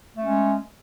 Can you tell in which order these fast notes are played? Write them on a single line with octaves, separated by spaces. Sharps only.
A3 C#4 G#3